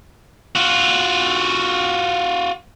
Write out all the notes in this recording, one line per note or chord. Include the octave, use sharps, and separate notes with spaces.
F4 F#4